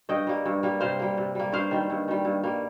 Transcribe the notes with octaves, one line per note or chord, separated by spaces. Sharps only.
G2 D#5 G5
G3 A#3
G2
G3 A#3
C3 C5 F5
G3 A#3
C3
G3 A#3
G2 C5 F5
D#3 G3
G2
D#3 G3
G2
G3 A#3